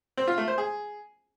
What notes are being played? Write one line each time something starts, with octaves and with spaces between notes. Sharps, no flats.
C4
F4
A3
C5
G#4